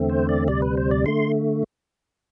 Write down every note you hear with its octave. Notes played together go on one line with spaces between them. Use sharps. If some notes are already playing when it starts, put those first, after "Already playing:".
Already playing: E2 D3 A3 C4
C5
D5
D2 C3 G3 D5
B4
C5
D5
D3 A3 C6